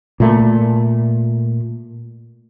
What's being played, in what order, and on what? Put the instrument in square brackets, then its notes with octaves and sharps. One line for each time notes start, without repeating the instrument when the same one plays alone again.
[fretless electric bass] A#2 A3